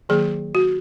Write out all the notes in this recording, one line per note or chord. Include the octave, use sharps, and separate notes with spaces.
D#3 F#3 A#3 G#4
F#4